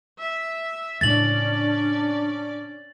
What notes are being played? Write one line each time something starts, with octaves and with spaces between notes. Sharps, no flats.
E5
A2 C#3 G#3 C#4 D4 D5 A6 F#7